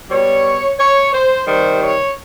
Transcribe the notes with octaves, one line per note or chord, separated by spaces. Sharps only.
B2 G3 C#5
C#5
C5
C3 D#3 G3 C5
C#5